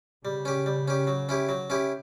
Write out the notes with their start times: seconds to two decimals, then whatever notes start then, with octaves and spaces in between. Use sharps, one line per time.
0.25 C#3 G3
0.45 C#4 G4
0.66 G3
0.88 C#4 G4
1.07 F#3
1.29 C#4 E4 G4
1.49 F#3
1.70 C#4 E4 G4